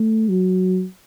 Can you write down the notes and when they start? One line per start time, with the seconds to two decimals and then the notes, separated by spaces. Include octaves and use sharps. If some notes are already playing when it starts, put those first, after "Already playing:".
Already playing: A3
0.29 F#3